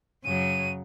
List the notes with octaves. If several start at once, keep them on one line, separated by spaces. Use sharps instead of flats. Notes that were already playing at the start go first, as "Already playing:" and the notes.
F#2 C#3 F#3 D#7